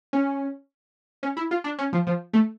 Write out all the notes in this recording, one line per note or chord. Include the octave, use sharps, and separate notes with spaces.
C#4
C#4
E4
F4
D4
C#4
F3
F3
A3